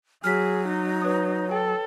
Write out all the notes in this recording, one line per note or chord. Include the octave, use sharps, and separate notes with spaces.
F#3 G#4 F6 B6
D#4
B4 C#5 D#6
A4 G5